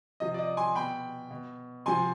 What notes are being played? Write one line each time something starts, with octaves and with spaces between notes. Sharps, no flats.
C3 F3 D#5
D5
D#5
G#5 C6
B2 G5 B5
B2
C3 F3 G#5 C6